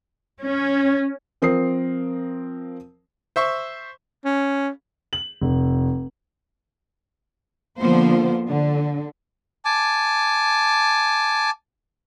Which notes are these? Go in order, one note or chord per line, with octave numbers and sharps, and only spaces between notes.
C#4
F3 C4 A#4 D#6 C7
C5 E5 C#6
C#4
F#7
F1
D3 F3 A#3 B3 F4 C5
D3
G#5 A5 D6